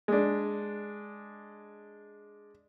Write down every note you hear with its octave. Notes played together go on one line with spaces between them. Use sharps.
G#3 D4